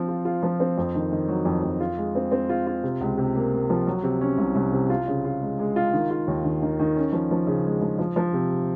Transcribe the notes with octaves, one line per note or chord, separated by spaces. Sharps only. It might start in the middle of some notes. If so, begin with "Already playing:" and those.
Already playing: F3 C4
F4
F4
F3
C4
F2
D#3
D#3
F#3
F2
F2
F4
G#3
C4
C4
F4
F4
C3
C#2
C3
A#3
A#3
F3
F#3
C3
C#4
C2
C2
C3
F4
C#3
F4
G#3
G#3
F4
D#3
F4
D#2
D#3
D#3
D#3
C#4
F3
F3
C#3
G#3
F3
F3
F3
C3